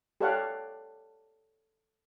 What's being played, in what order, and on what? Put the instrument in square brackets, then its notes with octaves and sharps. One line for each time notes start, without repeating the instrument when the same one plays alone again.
[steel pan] G4 A4 C#5 D5 F5 F#5